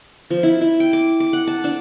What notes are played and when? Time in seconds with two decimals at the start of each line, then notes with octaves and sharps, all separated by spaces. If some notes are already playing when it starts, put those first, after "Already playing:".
0.30 F3
0.43 E4
0.61 E4
0.80 G5
0.93 D6
1.20 D6
1.33 F#5
1.47 A5
1.64 D4